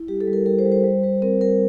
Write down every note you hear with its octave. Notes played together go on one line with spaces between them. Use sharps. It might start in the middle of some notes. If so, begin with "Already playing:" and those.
Already playing: E4
G3 G4
A4
G3
A#4
G3 A#4
C5
G3
C5
G3
G3
C4 A#4
G3 A#4